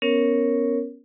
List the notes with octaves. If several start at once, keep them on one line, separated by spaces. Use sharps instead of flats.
B3 C#4 A#4 C#5